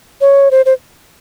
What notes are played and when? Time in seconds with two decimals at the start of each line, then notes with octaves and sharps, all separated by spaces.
0.21 C#5
0.51 C5
0.66 C5